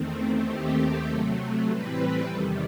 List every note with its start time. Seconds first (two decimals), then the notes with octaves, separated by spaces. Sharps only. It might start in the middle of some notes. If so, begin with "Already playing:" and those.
Already playing: E2 D#3 A3 C4
0.45 D#2 D#3 A3 C4 G4
1.06 C3 F#3 A3 A4
1.68 A2 E3 G3 C4 B4
2.29 E2 C3 D#3 G3 A4